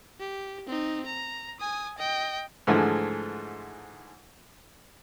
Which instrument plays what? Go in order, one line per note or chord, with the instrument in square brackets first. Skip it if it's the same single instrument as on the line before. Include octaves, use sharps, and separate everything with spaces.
[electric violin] G4
C4 D#4
A#5
G#5 D#6
D#5 G5
[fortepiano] G#2 D3 E3 F3 G#3 A3